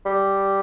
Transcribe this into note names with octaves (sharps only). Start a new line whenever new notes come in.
G3